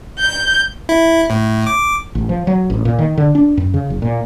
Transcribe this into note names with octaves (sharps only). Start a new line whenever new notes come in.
G6
E4
A2
D6
A1
F3
F#3
A1
A#2
D#3
D3
D4
F#2
C#3
F#1
A#2